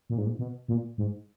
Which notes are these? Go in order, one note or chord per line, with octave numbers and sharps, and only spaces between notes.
A#2
G#2
A#2
B2
A#2
G#2